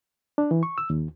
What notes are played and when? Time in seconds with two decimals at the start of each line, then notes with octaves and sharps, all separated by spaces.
0.38 D4
0.51 E3
0.63 C#6
0.78 E6
0.90 D#2